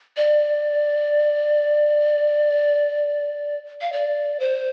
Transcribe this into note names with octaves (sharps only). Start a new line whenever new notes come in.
D5
F5
D5
C5